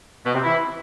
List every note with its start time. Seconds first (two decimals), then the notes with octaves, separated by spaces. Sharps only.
0.25 B2 B3
0.34 C3 C4
0.43 E3 E4